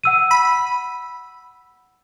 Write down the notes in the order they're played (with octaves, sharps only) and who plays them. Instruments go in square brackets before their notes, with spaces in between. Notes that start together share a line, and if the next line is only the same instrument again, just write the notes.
[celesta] F#5 E6 D#7
[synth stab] B5